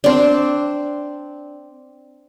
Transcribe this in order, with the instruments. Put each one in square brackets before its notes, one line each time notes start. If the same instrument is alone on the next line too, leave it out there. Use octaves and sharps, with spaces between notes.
[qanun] C4 D4